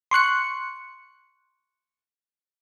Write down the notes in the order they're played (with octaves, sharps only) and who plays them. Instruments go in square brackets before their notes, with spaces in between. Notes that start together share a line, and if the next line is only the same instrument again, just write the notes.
[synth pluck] C6 C#6 F#6 C#7